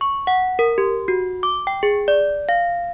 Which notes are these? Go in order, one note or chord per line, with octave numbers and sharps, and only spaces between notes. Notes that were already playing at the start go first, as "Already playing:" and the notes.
C#6
F#5
A#4
G4
F#4
D6
G5
G#4
D5
F5